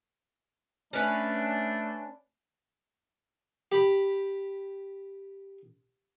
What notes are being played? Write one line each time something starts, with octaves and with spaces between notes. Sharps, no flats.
A3 C#4 D4 B4
G4 B5